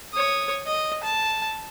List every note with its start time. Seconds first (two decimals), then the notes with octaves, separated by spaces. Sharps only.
0.14 C#5 D#6
0.66 D#5
1.03 A5